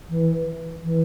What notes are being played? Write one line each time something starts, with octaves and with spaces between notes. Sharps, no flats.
E3
E3